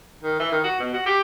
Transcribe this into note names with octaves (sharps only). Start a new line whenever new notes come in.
D#3
E3
D#3
F#4
B2
F#4
G4